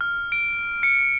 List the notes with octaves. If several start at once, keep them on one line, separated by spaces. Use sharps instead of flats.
F6
D7
C#7